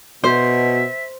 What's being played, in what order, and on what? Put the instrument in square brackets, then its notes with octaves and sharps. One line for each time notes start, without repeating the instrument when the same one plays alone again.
[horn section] B2 [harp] C5 [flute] E5